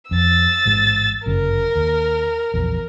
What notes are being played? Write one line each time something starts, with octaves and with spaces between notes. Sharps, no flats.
F2 E6 A6
A1 G#2 G#3
G1 F#2 C#3 A#4
D#2
A#1 E2